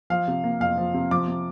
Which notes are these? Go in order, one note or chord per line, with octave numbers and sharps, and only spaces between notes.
F3 F5
C3
A#3
F2 F5
F3
C3
F3 D6
C3